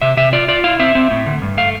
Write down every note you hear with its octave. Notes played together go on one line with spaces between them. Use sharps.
C3 E5
C3 E5
F4 D5
F4 D5
E4 F5
C4 E5
C4
A2
D3
G2
A3 F5